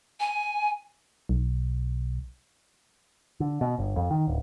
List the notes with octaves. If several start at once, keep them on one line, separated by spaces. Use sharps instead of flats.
G#5
B1
D3
B2
G1
F2
D#3
D1